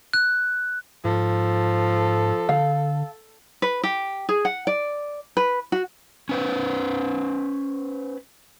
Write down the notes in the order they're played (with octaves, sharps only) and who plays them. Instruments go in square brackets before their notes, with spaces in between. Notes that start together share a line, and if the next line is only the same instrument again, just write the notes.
[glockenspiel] F#6
[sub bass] G#2 [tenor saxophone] F3 [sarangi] A4
[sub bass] D3 [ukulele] F5
[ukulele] B4
G4
G#4
F#5
D5
B4
F#4
[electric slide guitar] C#4 B4 C5